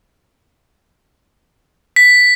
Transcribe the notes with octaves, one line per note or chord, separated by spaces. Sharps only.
B6